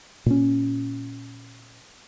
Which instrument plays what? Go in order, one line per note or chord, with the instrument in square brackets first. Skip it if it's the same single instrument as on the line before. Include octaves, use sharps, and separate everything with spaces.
[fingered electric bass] A#2 C#4